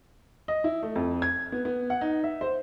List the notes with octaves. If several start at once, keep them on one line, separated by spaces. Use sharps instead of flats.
D#5
E4
A3
F2
G#6
B3
B3
F#5
D#4
E5
C5